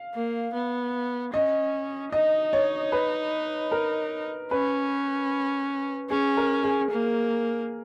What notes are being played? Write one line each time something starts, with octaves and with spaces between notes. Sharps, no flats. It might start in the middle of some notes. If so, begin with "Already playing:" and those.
Already playing: F5
A#3
B3
C#4 D#5
D#4 D#5
C#5
B4
A#4
C#4 B4
C#4 G#4
A#4
G#4
A#3